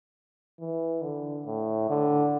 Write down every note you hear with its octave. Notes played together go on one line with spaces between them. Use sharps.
E3
D3
A2
D3